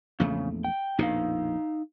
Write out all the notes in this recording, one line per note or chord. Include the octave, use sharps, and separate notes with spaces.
A#1 E2 C#3 A3
G5
A#1 F2 B2 D#4 F5